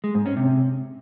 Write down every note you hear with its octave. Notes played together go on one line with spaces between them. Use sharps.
G#3
G#2
C#4
C3